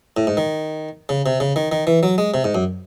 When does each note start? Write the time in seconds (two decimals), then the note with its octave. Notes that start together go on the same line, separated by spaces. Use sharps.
0.17 A2
0.27 G#2
0.37 D#3
1.09 C#3
1.26 C3
1.40 C#3
1.56 D#3
1.72 D#3
1.87 E3
2.03 F#3
2.18 G#3
2.34 C3
2.44 G#2
2.55 F#2